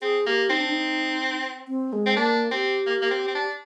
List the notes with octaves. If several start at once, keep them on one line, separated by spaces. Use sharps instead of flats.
C4 G#4
A#3 G4
C4 D#4
D4
D#4
C4
G#3
C4
A#3 D4
C4 G4
A#3
A#3
C4
C4
D4